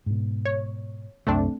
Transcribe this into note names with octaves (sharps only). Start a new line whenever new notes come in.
G#2 B2
C#5
C2 F#2 A3 C4 D4